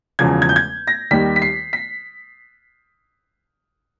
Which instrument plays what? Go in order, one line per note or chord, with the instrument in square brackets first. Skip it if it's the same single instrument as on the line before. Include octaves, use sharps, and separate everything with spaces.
[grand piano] E1 E2 C#3 F3 G#6
G#6
G6
G#6
A#6
D#2 D#3 G3 B6
B6
C7
B6